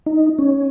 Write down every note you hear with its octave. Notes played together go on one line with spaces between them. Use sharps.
D#4
C#4